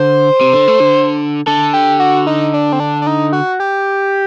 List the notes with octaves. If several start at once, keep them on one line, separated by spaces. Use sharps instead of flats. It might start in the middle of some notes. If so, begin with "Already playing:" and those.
Already playing: D3 C5
C3
D3
A3
D3
D3 A4
G4
F#4
D#4
D4
C4
D4
D4
D#4
F#4
G4